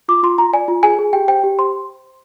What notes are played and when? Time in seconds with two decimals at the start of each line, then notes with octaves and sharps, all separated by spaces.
0.08 F4 D6
0.23 F4 C6
0.38 F4 A#5
0.53 D5 G#5
0.68 F4
0.83 G#4 G#5
0.99 G#4
1.13 G4 G5
1.28 C5 G5
1.44 G4
1.58 C5 C6